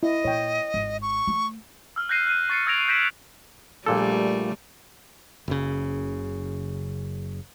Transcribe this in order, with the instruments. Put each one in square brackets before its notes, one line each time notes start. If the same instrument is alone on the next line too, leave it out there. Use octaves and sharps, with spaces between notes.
[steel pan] E4 [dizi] D#5
[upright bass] A#2 [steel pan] C#5 G5
[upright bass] G#1
[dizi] C#6
[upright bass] A3
[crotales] E6 F6
F#6 G6 A#6 C7 D#7
F#6 C7 D#7
C#6 A6 C7 C#7 D#7
D#6 E6 G#6 A#6 D7 F7
G6 A#6 B6 D7 E7 F#7
[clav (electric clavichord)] A#1 A#2 A4 [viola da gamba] G3 A3
[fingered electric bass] F#1 C#3